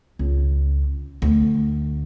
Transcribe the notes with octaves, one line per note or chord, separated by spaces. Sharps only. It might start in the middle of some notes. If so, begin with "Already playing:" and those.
C#2
D2